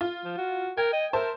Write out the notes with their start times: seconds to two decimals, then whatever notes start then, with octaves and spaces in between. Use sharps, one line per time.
0.01 F4
0.24 F3
0.38 F#4
0.77 A#4 G5 G#6
0.93 D#5
1.13 A#4 C5 E5 A5